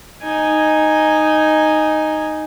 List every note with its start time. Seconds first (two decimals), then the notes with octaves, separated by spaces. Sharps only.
0.22 D#4 G#5